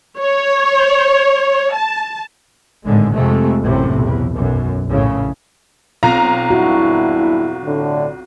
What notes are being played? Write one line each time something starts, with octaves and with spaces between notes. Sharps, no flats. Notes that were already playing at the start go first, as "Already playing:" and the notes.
C#5
A5
G#1 A2 D3 G#3
F2 C3 G#3 A3
A1 F#2 A2 C3
B1 E2
B1 F#2
A#1 A2 C#3
B1 C4 F4 F5 A#5
E2 G2 E4 F#4
A2 D3